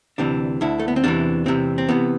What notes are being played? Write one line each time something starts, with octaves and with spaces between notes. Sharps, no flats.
D2 C3 E3 D4
D2 D3 E4
A3
B3
C4
E2 C3 E3 D4
E2 C3 E3 C4
C4
C3 E3 B3